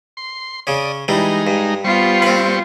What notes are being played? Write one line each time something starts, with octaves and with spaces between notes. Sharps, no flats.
C6
C#3 C#4 D5 D#6
E3 G3 G#3 D4 D#4 A#5
G2
G3 B3 F4 C5 C#6
C4 B4